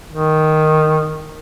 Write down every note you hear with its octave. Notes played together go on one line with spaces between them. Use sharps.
D#3